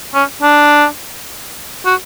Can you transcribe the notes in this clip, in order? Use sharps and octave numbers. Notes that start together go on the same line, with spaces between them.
C#4
D4
F#4